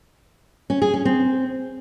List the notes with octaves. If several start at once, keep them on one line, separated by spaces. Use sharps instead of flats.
C#4
G#4
C#4
C4